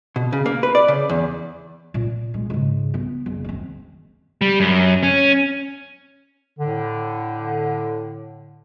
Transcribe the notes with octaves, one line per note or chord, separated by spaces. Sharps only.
B2
C#3
A#3
B4
D5
C#3
E2
A#2
G#3
G#2 C#3
B3
F#1
D#3 C4
G3
F#2
C#4
A2 D3